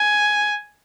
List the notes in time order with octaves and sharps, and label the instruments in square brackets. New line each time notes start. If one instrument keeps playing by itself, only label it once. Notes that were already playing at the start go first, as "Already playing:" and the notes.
Already playing: [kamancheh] G#5